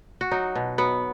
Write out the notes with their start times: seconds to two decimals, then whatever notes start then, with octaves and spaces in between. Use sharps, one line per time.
0.21 F#4
0.31 F#3 D#4
0.55 B2
0.78 F#3 B3